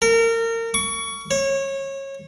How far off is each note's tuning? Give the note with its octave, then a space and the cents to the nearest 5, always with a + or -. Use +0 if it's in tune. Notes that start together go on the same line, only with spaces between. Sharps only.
A#4 -30
C#6 +25
C#5 -25